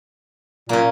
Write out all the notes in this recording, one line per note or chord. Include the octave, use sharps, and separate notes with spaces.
A#2 A#3 C#4